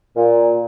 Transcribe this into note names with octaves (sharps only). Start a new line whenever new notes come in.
A#2